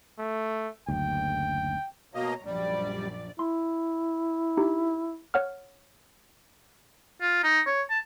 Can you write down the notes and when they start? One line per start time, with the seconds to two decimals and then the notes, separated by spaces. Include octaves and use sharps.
0.19 A3
0.88 F#1 D2 G5
2.15 B2 A#3 C#5 D#5 A#5
2.46 A#1 F#2 G3 D5
3.39 E4 C6
4.57 D#4 G4
5.34 C#5 F#5 F6
7.22 F4
7.44 D#4
7.67 C#5
7.90 A5